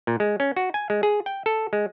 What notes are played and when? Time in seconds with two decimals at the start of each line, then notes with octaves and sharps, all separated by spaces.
0.07 A#2
0.20 G#3
0.40 C#4
0.56 F#4
0.74 G#5
0.90 G#3
1.03 G#4
1.26 G5
1.46 A4
1.73 G#3